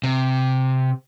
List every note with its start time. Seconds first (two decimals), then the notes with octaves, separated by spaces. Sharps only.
0.03 C3